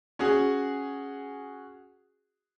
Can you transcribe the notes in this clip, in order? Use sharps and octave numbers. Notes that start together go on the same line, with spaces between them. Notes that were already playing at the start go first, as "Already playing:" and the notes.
C#4 F#4 G#4